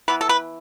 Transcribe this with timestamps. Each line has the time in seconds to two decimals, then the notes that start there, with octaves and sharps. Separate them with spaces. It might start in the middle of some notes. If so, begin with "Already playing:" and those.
0.08 E3 B3 B4
0.21 A4
0.29 B4